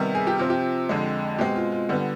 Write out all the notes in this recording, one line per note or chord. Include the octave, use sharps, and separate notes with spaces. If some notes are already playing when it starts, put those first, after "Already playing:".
Already playing: C3 D#3 G3 B3
G#4
G4
C3 F3 C4 F4
G4
F2 D3 G#3
B2 G#3 C4 G4
F4
F4
D3 G3 B3